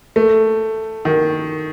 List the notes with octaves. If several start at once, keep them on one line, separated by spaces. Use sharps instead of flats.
A3
D#3